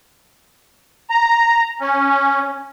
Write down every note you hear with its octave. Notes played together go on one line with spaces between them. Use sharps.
A#5
C#4